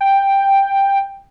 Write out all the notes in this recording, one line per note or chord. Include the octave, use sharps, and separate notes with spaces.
G5